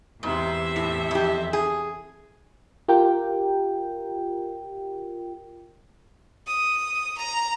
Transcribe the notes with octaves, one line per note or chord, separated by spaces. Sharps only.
E2 G#2 C3 E5
A2
F2 G4
G#4
F4 G4 A#4 G5
D#6
A#5